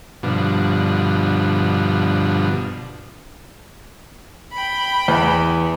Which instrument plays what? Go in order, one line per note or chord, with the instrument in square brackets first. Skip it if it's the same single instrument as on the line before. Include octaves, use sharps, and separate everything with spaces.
[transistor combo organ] G2 B2 D3 F3
[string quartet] G5 B5
[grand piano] E2